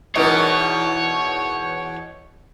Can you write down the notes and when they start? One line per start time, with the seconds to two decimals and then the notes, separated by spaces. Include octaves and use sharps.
0.15 E2 B2 E3 D#4 A#4 C#5